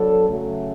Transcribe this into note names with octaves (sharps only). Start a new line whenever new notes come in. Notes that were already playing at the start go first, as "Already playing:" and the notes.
Already playing: F#3 B3 D4 A4 C#5
C#3 F#3 A3